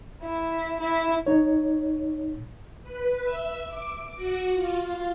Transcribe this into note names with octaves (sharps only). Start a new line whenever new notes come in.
E4
E4
D#4 C#5
B4
E5
D6
F#4
F4